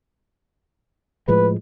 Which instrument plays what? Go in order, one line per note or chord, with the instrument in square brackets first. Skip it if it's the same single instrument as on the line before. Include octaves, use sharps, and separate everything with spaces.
[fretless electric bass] A2 F3 G#3 [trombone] B4